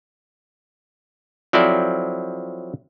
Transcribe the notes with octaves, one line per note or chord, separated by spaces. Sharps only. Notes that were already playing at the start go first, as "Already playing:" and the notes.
F3 F#3 C4 E4 A4 D5